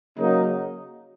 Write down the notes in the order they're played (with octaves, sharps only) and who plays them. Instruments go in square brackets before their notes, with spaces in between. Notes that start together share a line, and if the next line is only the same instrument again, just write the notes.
[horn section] C#3 F#3 A#3 D#4